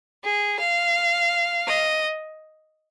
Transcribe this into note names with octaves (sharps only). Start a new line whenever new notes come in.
G#4
F5
D#5